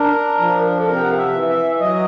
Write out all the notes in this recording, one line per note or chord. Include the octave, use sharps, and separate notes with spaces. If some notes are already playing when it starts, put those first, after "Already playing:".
Already playing: D4 A#4
F3
A4
C3 A#4
G5
F#5
F5
E5
E3
E5
F#3 D#5